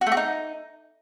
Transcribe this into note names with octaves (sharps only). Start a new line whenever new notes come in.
F#4
A3
F#4
D#4